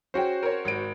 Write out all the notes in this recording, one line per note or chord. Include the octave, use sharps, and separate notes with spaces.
C#4 F#4 G#4 C5 G5
A#4 C#5
G#1 D7